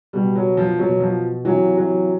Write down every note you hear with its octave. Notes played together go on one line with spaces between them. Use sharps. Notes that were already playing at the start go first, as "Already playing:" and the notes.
B2 G3
F#3
F3
B2 F#3
F3
C3 E3 F#3
F#3